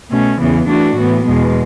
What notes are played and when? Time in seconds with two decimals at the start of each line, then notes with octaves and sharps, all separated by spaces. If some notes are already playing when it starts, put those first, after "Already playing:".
0.12 B2 A3 C#4
0.40 E2 C#3 E3 B3
0.69 E3 A3 D4 F#4
0.97 A2 E3 B3
1.26 E2 B2 G#3 B3